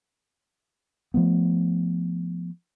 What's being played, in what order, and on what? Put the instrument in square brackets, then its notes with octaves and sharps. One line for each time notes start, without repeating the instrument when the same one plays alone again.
[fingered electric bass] F3 A3 B3